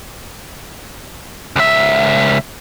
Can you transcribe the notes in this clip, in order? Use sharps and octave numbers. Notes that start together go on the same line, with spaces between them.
C#2 E5